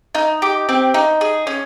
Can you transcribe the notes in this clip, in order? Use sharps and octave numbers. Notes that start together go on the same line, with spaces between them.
D#4
G4
C4
D#4
G#4
C#4